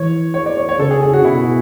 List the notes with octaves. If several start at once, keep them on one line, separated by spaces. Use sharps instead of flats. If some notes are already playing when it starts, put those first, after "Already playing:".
Already playing: E3 C#5
C#5
D5
C#5
C#5
C#3 A4
G#4
G#4
F#4
B2 E4
F#4